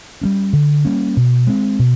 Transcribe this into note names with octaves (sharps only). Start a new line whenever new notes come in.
G3 A#3 C#4
D3
G3 A#3 C#4
B2
G#3 C4
B2